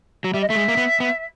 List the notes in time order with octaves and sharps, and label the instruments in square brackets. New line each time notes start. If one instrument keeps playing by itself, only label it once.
[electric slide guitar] F#3
[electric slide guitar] G3 [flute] E5
[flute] D#5
[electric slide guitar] A3 [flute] E5
[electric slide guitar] G#3
A#3
B3
B3